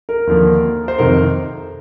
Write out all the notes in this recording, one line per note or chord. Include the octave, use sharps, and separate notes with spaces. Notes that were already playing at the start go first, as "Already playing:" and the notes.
A#4
D#2 D3 F3 A#3
C5
F2 C3 D#3 A#4